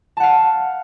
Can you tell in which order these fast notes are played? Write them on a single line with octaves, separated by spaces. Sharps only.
A5 F#5 F5